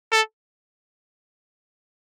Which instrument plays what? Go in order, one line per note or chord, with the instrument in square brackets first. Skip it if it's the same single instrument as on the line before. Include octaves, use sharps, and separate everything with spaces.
[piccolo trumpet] A4